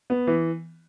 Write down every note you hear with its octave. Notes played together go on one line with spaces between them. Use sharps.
B3
E3